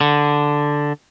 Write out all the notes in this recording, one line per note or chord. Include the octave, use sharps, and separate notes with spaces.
D3